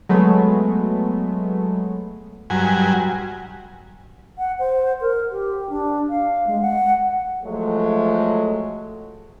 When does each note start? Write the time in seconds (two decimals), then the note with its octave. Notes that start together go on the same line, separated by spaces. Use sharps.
0.09 F#3 G#3 A3 B3
2.50 G2 F#3 G#5
4.38 F#5
4.59 C5
5.01 A#4
5.31 G4
5.70 D4
6.09 F5
6.47 G#3
6.62 F#5
7.43 F3 F#3 G#3 A3